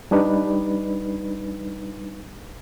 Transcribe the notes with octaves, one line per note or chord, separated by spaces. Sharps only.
G3 D4 D#4 B4